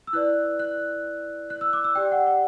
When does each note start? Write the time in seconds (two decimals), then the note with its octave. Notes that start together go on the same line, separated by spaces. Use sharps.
0.07 E6
0.13 E4 B4 D5 F#6
0.59 F#6
1.50 F#6
1.61 E6
1.73 D6
1.84 E6
1.95 G4 D5 G5
2.12 F#5
2.27 F#5